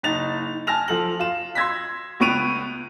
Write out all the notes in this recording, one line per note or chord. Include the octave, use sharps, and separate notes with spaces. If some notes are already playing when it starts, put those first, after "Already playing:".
F#1 D#4 A6 F7
G#5 A5 F6 A#6 F7
F3 A4 F#7
F4 E7
C6 E6 G#6 A#6 B6
C#2 B3 C#6 D7 D#7 F7